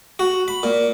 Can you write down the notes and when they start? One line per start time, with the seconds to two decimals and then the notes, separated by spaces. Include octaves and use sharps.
0.19 F#4
0.48 B5
0.63 A#2